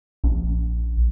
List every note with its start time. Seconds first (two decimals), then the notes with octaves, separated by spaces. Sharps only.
0.24 A#1